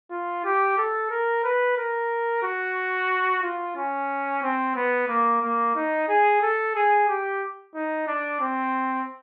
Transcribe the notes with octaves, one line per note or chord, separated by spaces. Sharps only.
F4
G4
A4
A#4
B4
A#4
F#4
F4
C#4
C4
B3
A#3
A#3
D#4
G#4
A4
G#4
G4
D#4
D4
C4